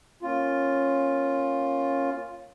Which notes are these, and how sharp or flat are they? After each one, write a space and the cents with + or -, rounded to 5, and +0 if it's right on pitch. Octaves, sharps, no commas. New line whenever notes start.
A#3 +0 C#4 -15 F4 +5